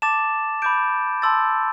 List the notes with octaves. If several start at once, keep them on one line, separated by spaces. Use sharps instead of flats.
A5 D6 A6 E7
B5 D6 G6 D7
A5 C6 E6 A6